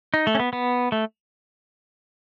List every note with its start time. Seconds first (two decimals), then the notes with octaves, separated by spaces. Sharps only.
0.14 D#4
0.27 A3
0.35 C#4
0.40 B3
0.53 B3
0.92 A3